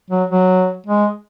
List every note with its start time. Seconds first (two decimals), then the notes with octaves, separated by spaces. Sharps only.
0.10 F#3
0.30 F#3
0.86 G#3